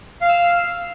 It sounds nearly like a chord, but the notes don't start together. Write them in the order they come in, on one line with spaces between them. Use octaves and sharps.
F5 F6 E6